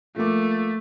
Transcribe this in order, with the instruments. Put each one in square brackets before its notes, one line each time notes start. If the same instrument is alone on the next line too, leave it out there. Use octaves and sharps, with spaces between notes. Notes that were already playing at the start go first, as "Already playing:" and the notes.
[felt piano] F3 A#3 D6 [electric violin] A3